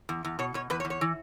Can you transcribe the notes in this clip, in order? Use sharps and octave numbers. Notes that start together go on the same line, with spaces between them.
E2
E2
B2 C#5
B2 C#5
E2 B4
C#5
E2
C#5
E3